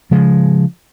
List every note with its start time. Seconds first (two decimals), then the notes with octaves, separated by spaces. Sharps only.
0.11 C#3 F3 G#3